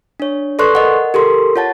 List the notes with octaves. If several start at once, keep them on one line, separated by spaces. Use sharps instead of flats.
D4 C#5
A4 B4 D5 C6 C#6 F#6
A#4 D#5 F#5
G4 A4 A#4 C6
F4 C#5 F#5 A5 A6